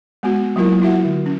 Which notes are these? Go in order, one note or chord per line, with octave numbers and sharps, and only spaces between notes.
G#3 B3 F#4
F#3 A#3 E4 F4 A#4
E4 F#4 E5 F#5
D3
C#4